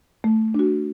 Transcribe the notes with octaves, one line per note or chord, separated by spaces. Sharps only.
A3
D4 F#4